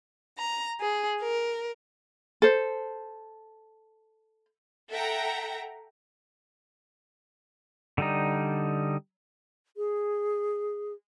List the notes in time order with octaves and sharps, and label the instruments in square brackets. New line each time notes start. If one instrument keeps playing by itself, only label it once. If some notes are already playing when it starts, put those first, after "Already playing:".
[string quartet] A#5
G#4
A#4
[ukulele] A4 C5
[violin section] A4 E5 F#5 G5 A#5
[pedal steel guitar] D3 G3 D#4
[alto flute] G#4